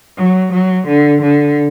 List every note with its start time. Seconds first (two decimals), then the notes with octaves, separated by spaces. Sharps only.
0.18 F#3
0.53 F#3
0.87 D3
1.22 D3